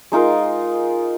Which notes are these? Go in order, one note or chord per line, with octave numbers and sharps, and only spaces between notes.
G#3 D#4 F4 A#4